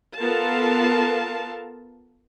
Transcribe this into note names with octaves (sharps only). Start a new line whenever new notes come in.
B3 F4 A4 A#4 F5 A5